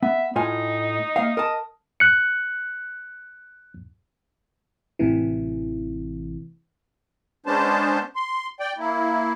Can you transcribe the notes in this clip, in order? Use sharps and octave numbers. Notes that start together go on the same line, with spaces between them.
B3 E5
A2 D#4 F4 G#5
A#3 E5 F5
A#4 D#5 A5
F#6 C#7
A1 A2 C3 E3
G#3 B3 C#4 D4 C5 A5
C6
D5 G5
A#3 E4